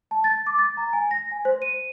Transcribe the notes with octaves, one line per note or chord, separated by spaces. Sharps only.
A5
A6
D6
A6
A#5
G#5
A#6
G#5
C5
D#7